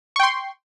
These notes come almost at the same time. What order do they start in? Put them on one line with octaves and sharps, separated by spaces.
C#6 G5 C6